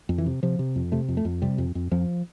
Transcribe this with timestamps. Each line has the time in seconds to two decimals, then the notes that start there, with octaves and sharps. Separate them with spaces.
0.09 F2
0.18 E3
0.26 C3
0.43 C3 F3
0.59 C3
0.76 F2
0.92 C3 A3
1.08 F2
1.17 A3
1.25 F2
1.42 C3 G3
1.58 F2
1.75 F2
1.91 F2 F3